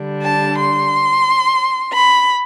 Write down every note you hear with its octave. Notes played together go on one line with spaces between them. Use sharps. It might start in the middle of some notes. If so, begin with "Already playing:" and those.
Already playing: D3 G3 D4
A5
C6
B5